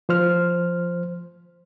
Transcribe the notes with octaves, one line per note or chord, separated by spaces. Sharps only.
F3 C5 F6